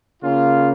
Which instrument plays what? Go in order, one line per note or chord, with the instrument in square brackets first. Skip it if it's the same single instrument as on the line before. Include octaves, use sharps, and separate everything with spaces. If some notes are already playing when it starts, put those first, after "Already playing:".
[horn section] C#3 A#3 C#4 F4